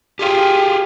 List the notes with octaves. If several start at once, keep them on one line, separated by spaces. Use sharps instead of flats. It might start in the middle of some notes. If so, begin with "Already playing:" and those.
F4 G4 G#4 G5